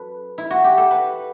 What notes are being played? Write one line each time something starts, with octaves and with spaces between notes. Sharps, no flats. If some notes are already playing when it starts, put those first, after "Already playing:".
Already playing: F#2 A4 B4
E4
F#4
G4
A4
B4